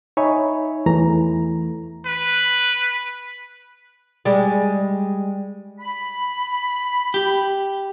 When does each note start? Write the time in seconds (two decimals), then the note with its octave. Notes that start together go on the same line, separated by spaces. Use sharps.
0.17 D#4 C#5 E5 G#5 B5
0.86 E2 E3 A3 A#5
2.06 B4
4.25 G3 G#3
5.80 B5
7.14 G4